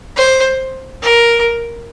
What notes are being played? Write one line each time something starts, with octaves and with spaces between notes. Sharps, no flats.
C5
A#4